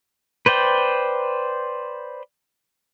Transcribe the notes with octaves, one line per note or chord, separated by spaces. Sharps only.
B4 C5 D5 G5